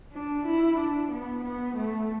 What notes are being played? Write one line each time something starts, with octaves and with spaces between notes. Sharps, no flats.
D4
E4
D4
B3
B3
A3